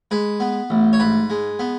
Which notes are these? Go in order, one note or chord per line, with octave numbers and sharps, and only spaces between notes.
G#3 B4
B3
A1
C#5
G#2 B4
G#3
B3